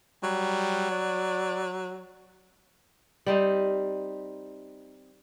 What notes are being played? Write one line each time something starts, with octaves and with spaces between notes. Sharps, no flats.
F#3 G3
D5
G3 C4 D#4